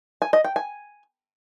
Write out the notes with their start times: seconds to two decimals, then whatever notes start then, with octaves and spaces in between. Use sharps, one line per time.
0.22 G#5
0.33 D#5
0.44 G5
0.56 G#5